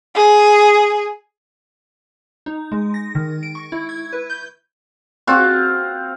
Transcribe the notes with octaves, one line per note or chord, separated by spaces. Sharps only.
G#4
D#4
G#3
A#6
D#3
D7
C#6
E4
G#6
B4
G6
C4 F4 F#4